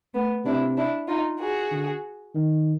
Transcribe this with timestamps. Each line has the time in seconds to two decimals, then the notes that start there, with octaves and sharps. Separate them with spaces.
0.14 A3 B3
0.45 C3 D4 E4
0.77 D4 E4
1.08 D#4 F4
1.40 F#4 G#4
1.71 D3
2.34 D#3